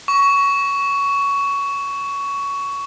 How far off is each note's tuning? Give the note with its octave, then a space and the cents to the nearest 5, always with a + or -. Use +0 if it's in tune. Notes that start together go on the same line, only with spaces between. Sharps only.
C#6 +15